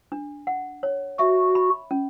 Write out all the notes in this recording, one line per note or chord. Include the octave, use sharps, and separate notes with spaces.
D4
F#5
C#5
F#4 E5
B5
C#4